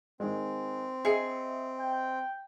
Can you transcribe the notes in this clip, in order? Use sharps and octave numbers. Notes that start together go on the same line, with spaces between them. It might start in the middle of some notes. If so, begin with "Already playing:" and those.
D#3 G#3 C4
G#4 D#5 E5 C#7
G5